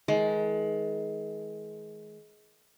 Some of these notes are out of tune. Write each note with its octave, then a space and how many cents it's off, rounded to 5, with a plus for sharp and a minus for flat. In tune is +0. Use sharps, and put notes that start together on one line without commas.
D#3 +45 G#3 +25